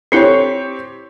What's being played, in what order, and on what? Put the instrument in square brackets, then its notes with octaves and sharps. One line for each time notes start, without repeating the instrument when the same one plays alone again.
[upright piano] C4 G4 C#5 [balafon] D4 E4 A4